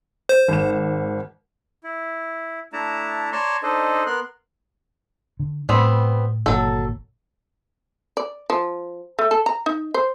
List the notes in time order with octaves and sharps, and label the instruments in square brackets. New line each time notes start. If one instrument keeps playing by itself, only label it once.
[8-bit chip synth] C5
[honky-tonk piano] G#1 E7
[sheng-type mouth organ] E4
A3 D4 E4 A5 A#5
C#5 D5 A5 A#5 C6 C#6
D4 D#4 A4 C5 D#5
B3 A#4 C6 F#6
[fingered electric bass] D3
[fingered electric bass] A2 [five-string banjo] G3 B3 C4
[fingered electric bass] G1 A#2 D#3 [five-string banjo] F#3 A4
[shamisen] D5
F3
A3
A4
A#5
D#4
C5